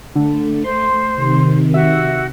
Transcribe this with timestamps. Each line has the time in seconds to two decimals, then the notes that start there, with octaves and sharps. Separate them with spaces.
0.15 D3 A3
0.64 C5 C6
1.14 C3 D#3
1.74 F#4 E5